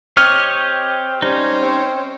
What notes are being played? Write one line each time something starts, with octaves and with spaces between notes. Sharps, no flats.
C4 G4 C#5 D#5 F6
G3 C#4 D#4 C5 C#5
C4